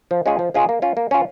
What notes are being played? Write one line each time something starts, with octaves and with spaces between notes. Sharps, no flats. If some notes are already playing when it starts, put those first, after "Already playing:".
F3
G#3 C#4 F4 G#4
F3
G#3 C#4 F4 G#4
A#3
C#4 F4
A#3
C#4 F4